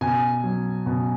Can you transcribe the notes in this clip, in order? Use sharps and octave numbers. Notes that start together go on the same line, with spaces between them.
B2 G#5
F#3
B2